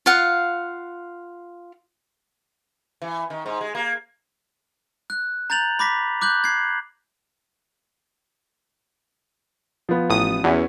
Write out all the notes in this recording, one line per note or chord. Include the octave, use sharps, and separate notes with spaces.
F4 F5 F#5
E3
D#3
G#2
G#3
A#3
F#6
A#5 G6 A6 F7 F#7
B5 D6 A#6 B6
D6 F#6 G6 F#7
G#6 C7
F3 B3
A1 D#6
E2 C#4 E4 F#4